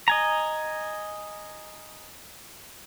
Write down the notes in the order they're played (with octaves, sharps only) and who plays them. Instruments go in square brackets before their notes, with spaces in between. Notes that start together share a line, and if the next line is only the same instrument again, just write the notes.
[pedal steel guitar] D#5 G#5 A#5